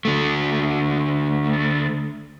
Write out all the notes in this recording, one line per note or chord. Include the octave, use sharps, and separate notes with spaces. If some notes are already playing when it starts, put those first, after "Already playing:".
D3 A3